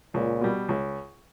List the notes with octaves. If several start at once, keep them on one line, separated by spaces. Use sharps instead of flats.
C#2 A#2
B2 G3
C#2